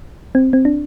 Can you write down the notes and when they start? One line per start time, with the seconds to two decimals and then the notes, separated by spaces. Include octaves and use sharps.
0.35 C4
0.53 C4
0.65 D4